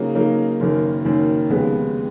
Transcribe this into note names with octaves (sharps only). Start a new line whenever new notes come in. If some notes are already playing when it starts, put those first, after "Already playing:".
Already playing: C#3 F#3 A#3 D#4
C#3 F#3 A#3 D#4
F#1 F#2 D#3 A#3
F#1 F#2 D#3 A#3
F1 D#2 C#3 G#3 B3